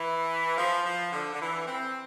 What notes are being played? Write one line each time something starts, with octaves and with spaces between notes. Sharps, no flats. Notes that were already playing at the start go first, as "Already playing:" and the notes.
Already playing: E3
F3
F3
D3
D3
E3
C4